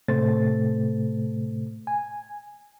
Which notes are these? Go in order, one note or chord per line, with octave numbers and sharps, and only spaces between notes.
A2 C3 A3 A4 C5 A6
G#5